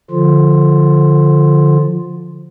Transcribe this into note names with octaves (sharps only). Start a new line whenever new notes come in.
D3 F3 F4